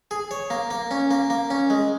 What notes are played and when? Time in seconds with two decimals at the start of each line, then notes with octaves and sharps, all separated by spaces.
0.11 G#4
0.31 C#5
0.50 A#3
0.71 A#3
0.91 C#4
1.11 A#3
1.30 A#3
1.50 C#4
1.70 G#3